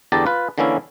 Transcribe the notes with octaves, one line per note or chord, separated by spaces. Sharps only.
E2 D3 G4 D5 A5 A#5
F4 B4
D3 E3 A#3 C#4 E4